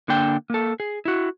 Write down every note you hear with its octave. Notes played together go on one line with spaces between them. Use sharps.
D3 A#3 D4 G5
A#3 A4
G#4
E4 F#4